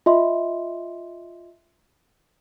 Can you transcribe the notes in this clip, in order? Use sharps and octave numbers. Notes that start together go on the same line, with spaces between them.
F4 D#5 E5 C6